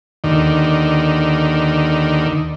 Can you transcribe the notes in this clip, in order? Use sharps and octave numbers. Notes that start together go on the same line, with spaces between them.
D#2 D3 D#3